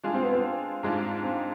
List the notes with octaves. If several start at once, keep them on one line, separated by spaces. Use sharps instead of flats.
G#3 D4 F4 G#4
C4
B3
C4
G#2 G#3 D4 F4
C4